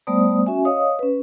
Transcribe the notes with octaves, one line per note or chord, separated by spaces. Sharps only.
G3 A3 B3 C5 D5 D#6
C#4 F#4 E5 G#5
C#5 D#5 F5 D#6
C#4 B4